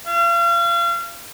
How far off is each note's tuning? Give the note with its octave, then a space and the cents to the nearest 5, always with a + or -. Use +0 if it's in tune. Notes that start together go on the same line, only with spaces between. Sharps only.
F5 -35